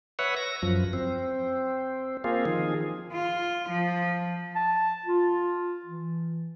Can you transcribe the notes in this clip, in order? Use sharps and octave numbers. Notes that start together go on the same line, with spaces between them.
B4 C#5 E5 F#5
A#6
F#2 F3
C4
A#3 C4 F4 G#4
D#3 F3 G#4
F4
F3
A5
F4
E3